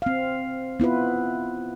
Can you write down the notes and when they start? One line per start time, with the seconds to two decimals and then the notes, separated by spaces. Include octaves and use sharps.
0.02 C4 F5
0.80 B3 E4 F4 B4